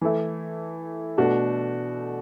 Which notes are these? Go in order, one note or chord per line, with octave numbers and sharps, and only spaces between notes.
E3 A3 E4
B2 A3 D4 F#4